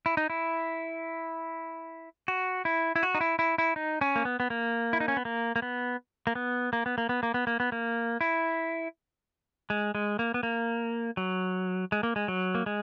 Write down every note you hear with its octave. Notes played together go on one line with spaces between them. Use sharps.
E4
D#4
E4
F#4
E4
E4
F#4
D#4
E4
E4
E4
D#4
C#4
A#3
B3
B3
A#3
E4
D#4
C#4
B3
A#3
A#3
B3
A#3
B3
A#3
B3
A#3
B3
A#3
B3
A#3
B3
A#3
E4
G#3
G#3
A#3
B3
A#3
F#3
G#3
A#3
G#3
F#3
A#3
G#3